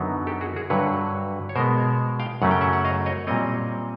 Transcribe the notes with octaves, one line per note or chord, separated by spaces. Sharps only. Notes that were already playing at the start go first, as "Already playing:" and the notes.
Already playing: F#2 D3 F#3 B3 D#4
G4 A4
F#4 G#4
F#4 G#4
G2 D3 F#3 B4 C#5
C#5
B2 G#3 B3 A#4 C5
F5 G5
F#2 C#3 F#3 A3 C#4 F#5
G5
E5 F#5
F#5
D#5 F5
C#5 D#5
A#2 G3 C4 C#5 D#5